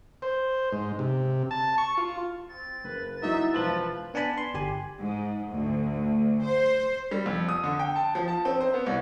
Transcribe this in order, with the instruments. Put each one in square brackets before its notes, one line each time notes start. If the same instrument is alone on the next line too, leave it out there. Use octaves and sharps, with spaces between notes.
[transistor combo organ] C5
G#2
C3
A5
C#6
F4
[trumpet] C4 [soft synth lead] A6
[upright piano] F#1 [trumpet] B4
[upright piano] F#3 E4 F#4 [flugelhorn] D#4 [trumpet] E5
[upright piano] E1 A5 F#7 [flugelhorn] F3 [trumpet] B4
[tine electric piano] B3 D4 G#5 A5 B5
C6
G1 G4 G#5
[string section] G#2
D2
C5
[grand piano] G3
F2
D#6
D3
G5
A5
F3
A5
C4
C5
B3
C2